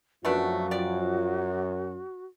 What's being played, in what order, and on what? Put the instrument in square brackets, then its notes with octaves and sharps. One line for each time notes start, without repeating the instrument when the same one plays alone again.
[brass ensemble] F#2 [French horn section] F3 F4 [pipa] A3 B3 D4 [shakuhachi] F#4
[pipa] G4 D5